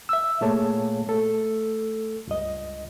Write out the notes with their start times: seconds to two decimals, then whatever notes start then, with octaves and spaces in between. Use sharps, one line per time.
0.09 E5 E6
0.41 A#2 A3 A#3 G#4 C#5 A5
1.07 A3 A4
2.27 C#2 G2 D#5